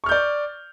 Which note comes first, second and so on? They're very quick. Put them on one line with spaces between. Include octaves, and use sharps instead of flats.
C#6 F6 G6 D5